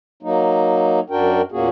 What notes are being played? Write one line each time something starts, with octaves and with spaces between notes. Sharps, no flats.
F#3 A#3 D#4
F#2 D4 F#4 A#4 G5
E2 A#2 A#3 C#4 F#4 G#4